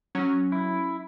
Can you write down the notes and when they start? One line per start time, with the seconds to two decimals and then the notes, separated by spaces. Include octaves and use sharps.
0.15 F#3 C#4
0.52 E4